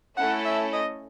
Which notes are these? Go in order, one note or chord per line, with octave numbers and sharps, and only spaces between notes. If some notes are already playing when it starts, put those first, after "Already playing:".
A3 C#4 E4 A4 F#5
E5
D#5